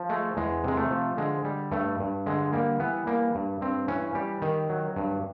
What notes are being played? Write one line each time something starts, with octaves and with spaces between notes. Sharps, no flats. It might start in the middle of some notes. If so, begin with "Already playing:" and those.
Already playing: F3
G#3 A3
E2 G#3
C3 G#3
A3
F3
D3 G#3
G3
G2 A3
G2
D3 G#3
G3 A#3
E3 B3
G3 A#3
G2
G2 C4
E3 C#4
G3 G4
D#3
F#3
G2